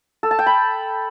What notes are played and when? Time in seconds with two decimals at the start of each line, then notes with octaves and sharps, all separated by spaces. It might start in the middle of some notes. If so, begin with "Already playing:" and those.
0.23 A4
0.31 A5
0.39 G5
0.46 B5